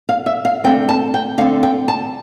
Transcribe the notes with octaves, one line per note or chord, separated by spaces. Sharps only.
F5
E5
F5
D3 A3 C4 G5
A5
G5
D3 A3 C4 F5
G5
A5